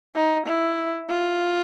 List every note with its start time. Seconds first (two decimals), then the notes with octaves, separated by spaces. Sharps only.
0.15 D#4
0.46 E4
1.09 F4